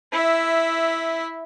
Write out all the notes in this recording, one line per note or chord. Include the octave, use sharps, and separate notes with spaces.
E4 E5